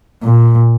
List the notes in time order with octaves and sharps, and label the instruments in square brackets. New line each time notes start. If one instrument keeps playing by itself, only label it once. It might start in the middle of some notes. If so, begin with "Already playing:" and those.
[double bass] A#2